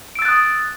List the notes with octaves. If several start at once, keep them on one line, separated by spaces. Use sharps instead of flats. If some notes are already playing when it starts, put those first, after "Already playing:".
D#6 E6 F#6 A6 D7